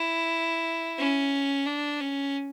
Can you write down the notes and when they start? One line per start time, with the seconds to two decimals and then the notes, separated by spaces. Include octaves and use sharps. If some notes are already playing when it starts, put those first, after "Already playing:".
Already playing: E4
0.99 C#4
1.66 D4
2.01 C#4